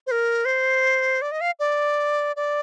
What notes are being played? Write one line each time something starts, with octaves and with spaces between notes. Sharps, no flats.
C5
A#4
C5
D5
D#5
F5
D5
D5